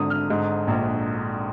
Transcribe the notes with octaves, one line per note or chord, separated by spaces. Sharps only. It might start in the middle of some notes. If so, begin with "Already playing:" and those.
Already playing: G#1 D3 D#6
F6
G#2
A#1